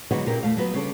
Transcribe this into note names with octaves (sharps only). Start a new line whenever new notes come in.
D3 F#3 G#3 B3 D#4 F#4
A#2 C#3 A#3 G4 A#4
E2 A3 F5
F#3 B3 B4
C#3 G3 D4 A4